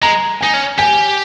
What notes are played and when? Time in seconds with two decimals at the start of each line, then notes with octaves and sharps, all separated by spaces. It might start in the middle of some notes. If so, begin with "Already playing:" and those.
0.02 G#3 A#5
0.41 D#4 G#5
0.53 C#4
0.78 G4 G#5